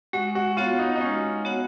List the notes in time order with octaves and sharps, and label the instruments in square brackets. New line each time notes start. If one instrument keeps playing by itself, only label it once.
[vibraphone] G#3 [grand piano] F#4
[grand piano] F#4
[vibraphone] B3 F#4 C#5 F#5 [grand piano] F4
[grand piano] D#4
D#4
[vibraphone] G#3 [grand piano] C#4
[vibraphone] B3 F#4 C#5 F#5